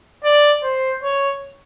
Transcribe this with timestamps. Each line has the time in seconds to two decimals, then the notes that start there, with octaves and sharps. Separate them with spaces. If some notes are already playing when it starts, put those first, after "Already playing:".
0.24 D5
0.63 C5
1.03 C#5